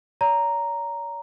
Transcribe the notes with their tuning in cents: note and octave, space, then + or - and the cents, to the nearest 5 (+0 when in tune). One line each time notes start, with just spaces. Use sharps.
C#5 +45 A#5 +0